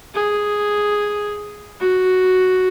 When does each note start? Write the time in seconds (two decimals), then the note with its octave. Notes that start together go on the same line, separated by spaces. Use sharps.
0.14 G#4
1.80 F#4